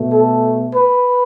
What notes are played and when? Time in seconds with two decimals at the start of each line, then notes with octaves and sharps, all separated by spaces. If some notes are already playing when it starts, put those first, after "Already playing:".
Already playing: B2 A3
0.13 A4
0.75 B4